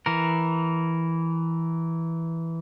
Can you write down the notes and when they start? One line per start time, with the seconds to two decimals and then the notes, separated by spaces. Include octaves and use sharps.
0.06 E3 A#4